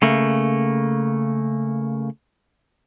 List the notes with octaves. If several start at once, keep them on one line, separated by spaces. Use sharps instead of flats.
C#3 A3 A#3